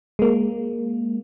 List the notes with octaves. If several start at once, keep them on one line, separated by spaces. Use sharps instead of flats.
G#3 A#3